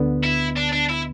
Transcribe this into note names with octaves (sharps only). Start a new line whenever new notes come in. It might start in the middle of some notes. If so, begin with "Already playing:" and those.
Already playing: D2 D3 B3
E4
D4
D4
E4